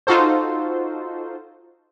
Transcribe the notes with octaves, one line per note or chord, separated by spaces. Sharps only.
D#4 F4 F#4 A4 C5